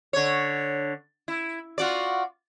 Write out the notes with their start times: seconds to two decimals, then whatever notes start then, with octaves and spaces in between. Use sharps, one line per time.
0.13 D3 C#5
1.28 E4
1.78 F4 F#4 D5